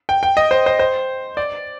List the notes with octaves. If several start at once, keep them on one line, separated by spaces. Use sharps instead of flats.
G5
G5
D#5
C5
C5
C5
D5